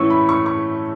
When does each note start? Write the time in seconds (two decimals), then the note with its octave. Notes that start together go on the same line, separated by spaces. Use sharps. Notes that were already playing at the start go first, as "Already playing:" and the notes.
Already playing: A2 E3 A3 C#4 C#6 E6
0.10 B5
0.29 C#6
0.46 C#6